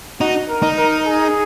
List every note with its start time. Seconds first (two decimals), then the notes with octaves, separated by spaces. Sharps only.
0.20 D#4 F#4
0.49 A#4
0.63 D#4
0.77 A#4
1.06 G#4